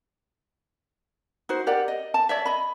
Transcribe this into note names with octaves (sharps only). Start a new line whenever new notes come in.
D#4 F#4 C5
G4 A#4 D5 F#5
D#5
A5
C#5 D5 E5
D#5 B5